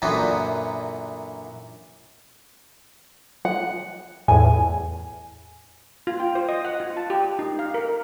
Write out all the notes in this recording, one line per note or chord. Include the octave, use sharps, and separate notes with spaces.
F#2 A#2 D3 E3 B3
F#5
E2 A2 G#5
F4
G5
C5
D#5
F#5
F4
A5
G4
D#4
F5
A#4
A#4